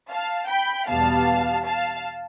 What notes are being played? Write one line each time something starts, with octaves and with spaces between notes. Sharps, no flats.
F5 A5
G5 B5
E2 B2 G3 B3 F5 A5
F5 A5